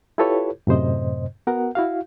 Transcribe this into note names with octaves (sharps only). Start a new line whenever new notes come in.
E4 F4 G4 A4 B4 C#5
F#2 A2 C3 C5 D#5
B3 F#4 A#4 F#5
E4 F#4 F5